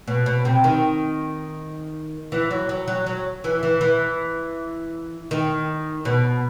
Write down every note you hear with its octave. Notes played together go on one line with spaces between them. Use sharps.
B2
B2
C3
D#3
E3
F#3
F#3
F#3
F#3
E3
E3
E3
D#3
B2